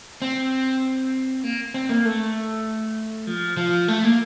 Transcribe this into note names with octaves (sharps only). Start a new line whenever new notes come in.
C4
A#3
C4
A#3
A3
F3
F3
A3
A#3